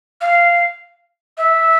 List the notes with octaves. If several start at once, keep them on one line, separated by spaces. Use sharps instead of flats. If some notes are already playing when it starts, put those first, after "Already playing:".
F5
E5